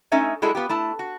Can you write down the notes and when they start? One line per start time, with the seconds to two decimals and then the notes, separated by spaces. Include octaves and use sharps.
0.12 A3 C#4 D#4 E5 G#5
0.42 G3 G#3 E4 F#4 G#4 A4
0.55 B3 F4 G4
0.69 A3 E4 A5
0.99 F#4